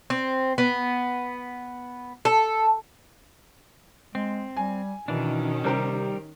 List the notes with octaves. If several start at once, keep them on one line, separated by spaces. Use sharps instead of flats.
C4
B3
A4
G#3 C4
G3 G#5
B2 D#3 E3 C#4 D4
C3 G3 G4 A#4 C5